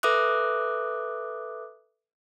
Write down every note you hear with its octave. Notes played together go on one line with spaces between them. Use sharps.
A4 B4 E5 D6 D#6 F#6